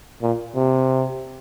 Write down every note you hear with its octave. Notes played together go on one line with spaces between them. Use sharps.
A#2
C3